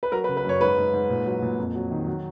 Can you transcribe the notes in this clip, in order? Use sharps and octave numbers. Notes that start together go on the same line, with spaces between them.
B4
F#3 A#4
B4
C#3
B4
F#2 C#5
G#2 B4
G#2
G#2
A#2
F#3
A#2
F2
F#3
D#3
F#3